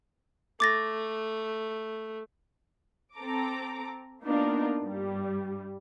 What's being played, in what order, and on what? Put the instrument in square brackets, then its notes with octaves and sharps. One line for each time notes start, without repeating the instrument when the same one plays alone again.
[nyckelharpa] A3 [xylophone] D6 A6 A#6
[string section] C4 A4 A#5 D6
A#3 B3 D4 D#4 F4 A#4
G2 G3